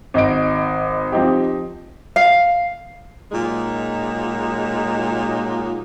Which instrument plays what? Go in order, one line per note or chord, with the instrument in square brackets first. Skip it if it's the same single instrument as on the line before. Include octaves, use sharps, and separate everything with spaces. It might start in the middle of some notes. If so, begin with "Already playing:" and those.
[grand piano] G#1 D#4 D#5 D7
F3 C4 D#4 G4
[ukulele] F5
[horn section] A#2 F#3 G#3 D#4